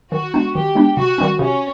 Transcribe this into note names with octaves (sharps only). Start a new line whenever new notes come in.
D#3 F#4
G#3 B3 D4
D#3 G4
G#3 B3 D4
C3 F#4
D#3 G3 C4
C3 C#4